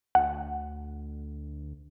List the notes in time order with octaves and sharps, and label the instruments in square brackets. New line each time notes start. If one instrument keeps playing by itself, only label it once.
[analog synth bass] D2 [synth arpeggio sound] F#5